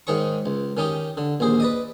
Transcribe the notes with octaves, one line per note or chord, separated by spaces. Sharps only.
G#2 D#3 G#4 C#5 C#6
C#2
D#3 C#4 D#4 G4
D3
A#1 D#2 G#4 C5
B4 D5 D#5